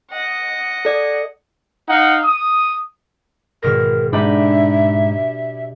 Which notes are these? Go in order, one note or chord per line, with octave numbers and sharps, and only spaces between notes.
D#5 F#5
A4 D5
D#4 F5 F#5
D#6
G#1 B2 A#4 A#6
G#2 D4 D#4 G4 E5 B5